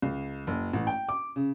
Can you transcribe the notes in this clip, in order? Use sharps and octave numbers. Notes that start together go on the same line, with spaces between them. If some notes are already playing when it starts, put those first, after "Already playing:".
C#2
F#1
A1
G5
D6
C#3